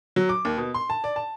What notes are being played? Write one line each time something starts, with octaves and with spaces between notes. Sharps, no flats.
F#3
D6
D#2
B2
C6
A5
D5
A5